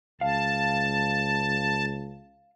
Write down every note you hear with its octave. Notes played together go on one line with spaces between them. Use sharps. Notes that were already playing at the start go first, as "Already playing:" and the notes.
C#2 F5 A5